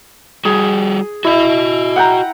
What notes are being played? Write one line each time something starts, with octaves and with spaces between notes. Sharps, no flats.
G3 F#4 G#4
E4 F#4 D#5
F#5 G5 A#5